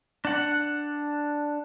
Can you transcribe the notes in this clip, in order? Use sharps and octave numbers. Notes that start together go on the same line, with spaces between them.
D4 F#5